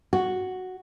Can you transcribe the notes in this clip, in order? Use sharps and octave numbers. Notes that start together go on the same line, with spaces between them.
F#4